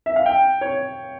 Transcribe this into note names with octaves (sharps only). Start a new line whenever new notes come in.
E5
F5
G5
C#5